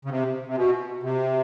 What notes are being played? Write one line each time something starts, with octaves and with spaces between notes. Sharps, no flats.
C#3
C3
C3
B2
C3